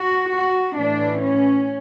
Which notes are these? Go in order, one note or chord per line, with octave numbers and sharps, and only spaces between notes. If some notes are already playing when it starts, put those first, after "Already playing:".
Already playing: F#4
F#4
A2 E3 A3 D4
C#4